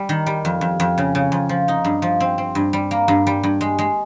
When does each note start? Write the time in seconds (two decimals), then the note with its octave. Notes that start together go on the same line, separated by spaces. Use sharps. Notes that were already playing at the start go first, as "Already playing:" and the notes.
Already playing: G3
0.09 D#3
0.26 G3
0.45 F2
0.61 F2
0.80 F2
0.98 C#3
1.15 C#3
1.32 F2
1.49 F3
1.68 D#4
1.85 G2
2.02 F3
2.20 C4
2.38 C4
2.55 G2
2.73 G3
2.91 A#3
3.08 G2
3.27 G3
3.43 G2
3.61 G#3
3.79 G#3